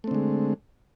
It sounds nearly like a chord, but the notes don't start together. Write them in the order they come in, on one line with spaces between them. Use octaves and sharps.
A3 C4 D3 G#3